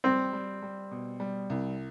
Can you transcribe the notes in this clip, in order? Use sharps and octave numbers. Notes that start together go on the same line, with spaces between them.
G3 C4
G3
G3
B2
G3
C2